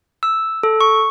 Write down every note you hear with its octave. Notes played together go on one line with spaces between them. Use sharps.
E6
A4
C#6